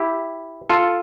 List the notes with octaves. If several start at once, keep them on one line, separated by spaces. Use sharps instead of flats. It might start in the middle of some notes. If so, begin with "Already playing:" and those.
Already playing: E4 G4
F4 A4